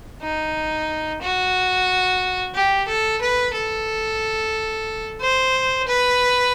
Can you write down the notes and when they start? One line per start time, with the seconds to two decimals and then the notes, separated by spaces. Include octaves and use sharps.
0.22 D#4
1.22 F#4
2.55 G4
2.88 A4
3.21 B4
3.54 A4
5.21 C5
5.88 B4